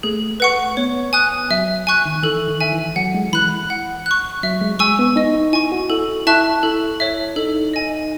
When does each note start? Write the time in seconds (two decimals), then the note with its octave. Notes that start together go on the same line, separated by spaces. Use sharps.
0.03 A3 G#4
0.40 B4 F#5 C#6
0.77 B3 C#5
1.13 G#5 D#6 F#6
1.51 F#3 E5
1.87 G#5 C#6 F#6
2.06 D#3
2.23 E3 A4
2.48 D#3
2.61 E5 G#5
2.73 E3
2.96 F#3 F#5
3.14 G#3
3.33 E3 B5 F#6
3.70 F#5
4.06 C#6 F#6
4.43 F#3 E5
4.61 G#3
4.79 G#3 G#5 C#6 E6
4.99 B3
5.16 D#4 D#5
5.35 D#4
5.53 E4 G#5 C#6
5.72 F#4
5.90 E4 A4
6.27 E4 E5 A5 C#6 F#6
6.63 E4 A4
7.00 C#5 E5
7.36 D#4 A4
7.74 D#5 G#5